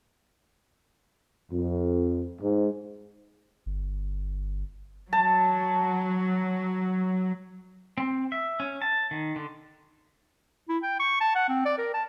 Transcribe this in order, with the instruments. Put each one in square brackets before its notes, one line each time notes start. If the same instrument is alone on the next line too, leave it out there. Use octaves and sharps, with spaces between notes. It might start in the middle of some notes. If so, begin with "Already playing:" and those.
[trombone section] F2
G#2
[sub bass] G1
[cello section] F#3 [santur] A5
[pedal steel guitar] C4
E5
C#4
A5
D#3
D3
[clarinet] E4
G5
C#6
A5
F#5
C4
D5
A#4
A5